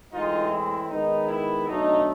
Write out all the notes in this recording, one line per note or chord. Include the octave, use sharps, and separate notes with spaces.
A2 E3 G#3 C4 D#4 F4
E4
D#3 G#3 B3 D#4
E4
B2 F#3 A3 D4 D#4